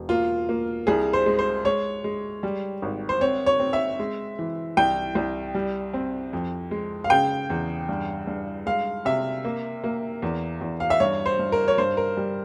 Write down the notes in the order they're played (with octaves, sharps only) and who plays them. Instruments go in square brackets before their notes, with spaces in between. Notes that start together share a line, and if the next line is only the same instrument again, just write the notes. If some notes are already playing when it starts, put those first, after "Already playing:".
Already playing: [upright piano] E1
A#3 F4
A#3
C2 G#4
C5
G#3
C5
G#3 C#5
G#3
G3
G#1
C5
C4 C#5
C#5
C4
E5
G#3
E3
C2 G5
C2
G3
C4
F2
G#3
F5
C#3 G5
E2
G2
G2
G#3 F5
C3 E5
A#3
A#3
E2
E2
F5
E5
G2 C#5
C5
G2
A#4
C#5
G2 C5
A#4
G3